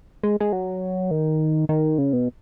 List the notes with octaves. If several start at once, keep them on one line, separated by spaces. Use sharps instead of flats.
G#3
G#3
F#3
D#3
D#3
C#3
B2